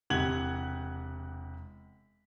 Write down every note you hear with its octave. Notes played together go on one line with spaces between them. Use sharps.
E1 C3 G4 F#5 G#6 F#7